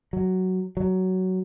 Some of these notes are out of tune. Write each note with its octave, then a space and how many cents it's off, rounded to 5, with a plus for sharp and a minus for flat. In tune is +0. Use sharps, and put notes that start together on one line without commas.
F#3 +5
F#3 +10